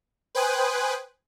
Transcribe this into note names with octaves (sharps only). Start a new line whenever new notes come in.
B4 C5 G5 G#5 D#6 F#6